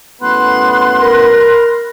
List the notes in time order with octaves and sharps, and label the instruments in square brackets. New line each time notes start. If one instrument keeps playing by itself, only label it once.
[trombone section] F#2 A2 B3 [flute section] B5 C6 F#6
[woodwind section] A#4